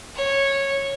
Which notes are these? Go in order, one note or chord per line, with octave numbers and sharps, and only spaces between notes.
C#5